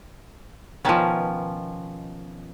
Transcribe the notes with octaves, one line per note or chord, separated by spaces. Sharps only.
B2 D#3 F3 B3 C#4